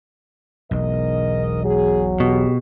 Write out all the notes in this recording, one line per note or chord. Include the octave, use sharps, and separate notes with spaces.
E1 B1 G#2 A#4 D#5
F#3 G#4
B2 G4 G#4